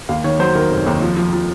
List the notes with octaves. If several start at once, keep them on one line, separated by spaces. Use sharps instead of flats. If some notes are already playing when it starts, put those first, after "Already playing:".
D#2 F5
D#3 C#5
F#3 C5
D#3 A#4
F1
D#2
F3
F3
F3